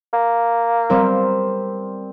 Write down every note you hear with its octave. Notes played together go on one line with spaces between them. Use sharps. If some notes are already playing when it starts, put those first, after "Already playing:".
A#3
G3 C4 A#4